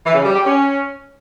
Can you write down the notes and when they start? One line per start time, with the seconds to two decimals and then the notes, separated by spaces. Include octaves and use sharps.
0.04 E3
0.15 C#3
0.25 G3
0.35 G4
0.45 C#4